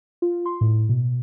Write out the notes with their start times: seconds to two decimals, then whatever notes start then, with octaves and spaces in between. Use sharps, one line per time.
0.22 F4
0.46 C6
0.61 A2
0.89 B2